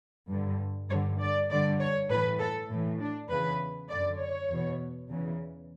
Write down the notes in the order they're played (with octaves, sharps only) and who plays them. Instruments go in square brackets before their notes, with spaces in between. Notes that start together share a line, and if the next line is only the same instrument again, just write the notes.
[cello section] G2 D3
G2 D3 C#5
D5
G2 D3 D5
C#5
A2 E3 B4
A4
A2 E3
D4
E2 C#3 E3 B4
F#2 D3 D5
C#5
E2 B2
E2 C#3 E3